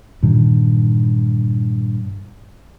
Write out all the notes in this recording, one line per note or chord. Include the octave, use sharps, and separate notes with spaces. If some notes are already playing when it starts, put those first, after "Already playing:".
G2 A#2 D#3 E3